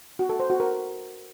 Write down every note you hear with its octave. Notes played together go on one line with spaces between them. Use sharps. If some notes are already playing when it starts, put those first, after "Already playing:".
F#4
A4
C5
F#4
A#4